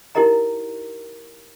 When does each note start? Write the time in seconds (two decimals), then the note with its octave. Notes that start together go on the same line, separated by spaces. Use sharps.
0.15 D#4 E4 G4 A#4 D#5 A#5